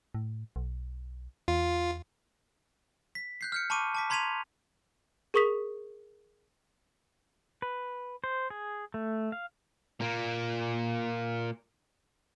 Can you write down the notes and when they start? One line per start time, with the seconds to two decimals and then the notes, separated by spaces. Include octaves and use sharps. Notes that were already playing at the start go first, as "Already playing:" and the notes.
0.15 A2
0.56 B1
1.48 E2 F4
3.15 B6
3.41 F#6 G6 C7
3.52 F6 G6 C#7
3.70 A5 B5 C#6 D6 D#7
3.95 A5 D6 B6
4.10 A#5 C6 G#6 B6 D#7 F7
5.34 G#4 A#4 C#6 D#6 B6 F7
7.62 B4
8.24 C5
8.50 G#4
8.94 A3
9.32 F5
10.00 A#2 A#3